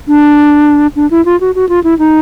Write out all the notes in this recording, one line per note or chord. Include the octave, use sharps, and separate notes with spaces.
D4
D4
E4
F4
F#4
F#4
F4
E4
D#4